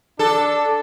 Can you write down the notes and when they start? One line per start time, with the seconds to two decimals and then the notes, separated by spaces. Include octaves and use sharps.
0.19 D4 A4